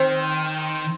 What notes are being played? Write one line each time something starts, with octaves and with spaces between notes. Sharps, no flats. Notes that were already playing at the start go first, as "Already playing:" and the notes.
Already playing: D#3 C4